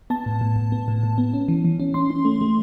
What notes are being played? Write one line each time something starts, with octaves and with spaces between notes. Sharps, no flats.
B3 A5
A2
A2
A2
B3
A2
A2
B3
C#4
E3
E3
C#4
C#4 C6
C#4
A3
A3